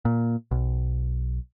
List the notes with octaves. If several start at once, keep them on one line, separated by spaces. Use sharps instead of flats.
A#2
B1